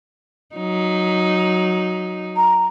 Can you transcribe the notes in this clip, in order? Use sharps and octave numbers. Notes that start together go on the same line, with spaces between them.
F#3 D#4
A#5